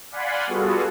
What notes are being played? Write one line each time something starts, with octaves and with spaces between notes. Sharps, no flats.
D5 F5 F#5 G#5 B5 C6
G3 B3 F4 F#4 G#4 A4